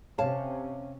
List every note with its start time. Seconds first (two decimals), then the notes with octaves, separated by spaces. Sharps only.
0.18 C3 C#4 C#5 F5 A5